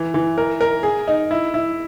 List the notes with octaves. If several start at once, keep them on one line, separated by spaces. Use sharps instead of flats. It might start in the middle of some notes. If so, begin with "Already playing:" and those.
Already playing: E3
E3
A#4
A#4
G#4
D#4
E4
E4